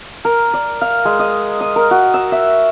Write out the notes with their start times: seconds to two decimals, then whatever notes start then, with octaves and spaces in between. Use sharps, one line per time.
0.25 A#4
0.54 D5
0.81 F5
1.05 G#3
1.19 D#5
1.61 D#6
1.76 A#4
1.91 F#4
2.14 E6
2.32 E5